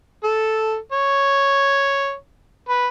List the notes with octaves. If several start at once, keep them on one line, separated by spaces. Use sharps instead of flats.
A4
C#5
B4